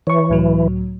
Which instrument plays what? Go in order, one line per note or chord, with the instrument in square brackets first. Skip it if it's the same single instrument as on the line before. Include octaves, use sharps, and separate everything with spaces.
[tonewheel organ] E3 [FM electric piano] C#5 C#6
[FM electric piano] C#2 A2 F#3